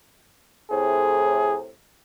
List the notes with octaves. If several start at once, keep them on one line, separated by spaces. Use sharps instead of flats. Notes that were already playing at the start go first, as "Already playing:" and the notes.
A2 C3 G#4